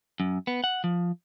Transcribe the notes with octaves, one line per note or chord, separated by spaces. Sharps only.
F#2
B3
F#5
F3